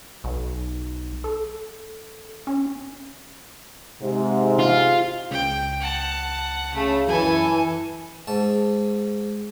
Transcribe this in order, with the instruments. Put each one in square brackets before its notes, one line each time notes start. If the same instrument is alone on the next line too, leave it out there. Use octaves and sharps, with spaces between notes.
[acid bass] B1
A4
C#4
[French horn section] G#2 C3
[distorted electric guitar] F4
[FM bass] C#2 [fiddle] G5
[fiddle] F#5 A5
[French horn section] C#3 [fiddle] A3
[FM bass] F#2 [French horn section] E3 [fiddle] A4 G#5
[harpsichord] G#2 A5